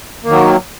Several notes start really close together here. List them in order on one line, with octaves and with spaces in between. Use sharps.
A#3 D#3 F#3